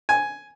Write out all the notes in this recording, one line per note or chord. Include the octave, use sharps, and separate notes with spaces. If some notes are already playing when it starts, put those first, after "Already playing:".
G#5